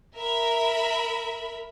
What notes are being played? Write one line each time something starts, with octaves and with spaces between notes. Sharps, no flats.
A#4 E5 B5